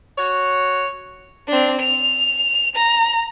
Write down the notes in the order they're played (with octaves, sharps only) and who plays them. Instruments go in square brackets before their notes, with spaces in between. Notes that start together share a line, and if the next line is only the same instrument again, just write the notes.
[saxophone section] F#4 C#5
[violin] C4 D4
F7
A#5